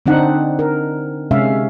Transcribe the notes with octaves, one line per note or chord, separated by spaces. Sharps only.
D3 C4 D4 D#4 F#5
A#4
C3 G#3 C#4 E5 F5